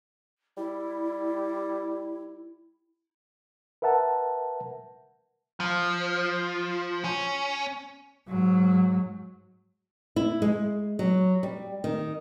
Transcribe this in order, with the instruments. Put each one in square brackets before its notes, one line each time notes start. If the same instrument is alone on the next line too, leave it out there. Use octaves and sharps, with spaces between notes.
[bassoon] G3 [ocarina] E4
[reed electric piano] A#4 B4 E5 F#5 A5
[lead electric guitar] F3
C#4
[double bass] G#2 F#3
[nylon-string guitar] E4
G#3
F#3
G3
D#3